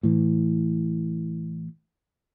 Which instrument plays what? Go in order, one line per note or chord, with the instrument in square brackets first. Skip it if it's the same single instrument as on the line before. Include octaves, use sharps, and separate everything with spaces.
[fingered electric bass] A2 E3